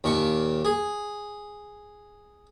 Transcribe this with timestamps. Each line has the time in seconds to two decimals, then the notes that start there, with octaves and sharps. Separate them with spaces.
0.04 D#2 A#2 C#6
0.65 G#4